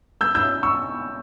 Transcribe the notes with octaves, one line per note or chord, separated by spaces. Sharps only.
E6 G6
E6 G6
C#6 E6